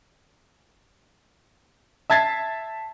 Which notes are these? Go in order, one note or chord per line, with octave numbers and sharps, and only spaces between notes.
E5 A5 G#6 A6 C7